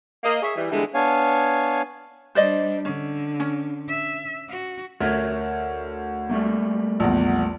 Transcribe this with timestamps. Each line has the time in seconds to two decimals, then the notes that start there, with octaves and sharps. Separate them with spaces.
0.24 A#3 D#5
0.42 G#4 C#5 E5
0.56 E3 G3
0.71 D3 E3 G3 G#3 B3
0.94 B3 D4 C#5 F5 G#5
2.35 G3 D4 C5 D5 D#5
2.85 D3 C#4
3.40 C#4
3.89 E5
4.49 F#4
5.00 D2 A#4 C#5 E5
6.30 G3 A3 A#3
7.00 A#1 E2